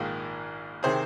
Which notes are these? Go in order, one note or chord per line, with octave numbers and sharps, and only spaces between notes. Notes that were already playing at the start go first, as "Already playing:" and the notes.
Already playing: A#1 G#2 D#3 F4 G#4
C3 D#3 G#4 C5